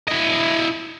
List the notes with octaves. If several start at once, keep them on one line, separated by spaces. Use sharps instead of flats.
E4 D#5